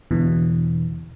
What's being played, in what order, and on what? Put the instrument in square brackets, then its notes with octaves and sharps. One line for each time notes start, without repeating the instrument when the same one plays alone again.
[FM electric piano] E2 B2 D3 E3